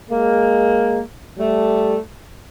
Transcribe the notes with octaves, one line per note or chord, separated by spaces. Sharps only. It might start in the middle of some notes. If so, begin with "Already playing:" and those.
G#3 A#3
G3 A3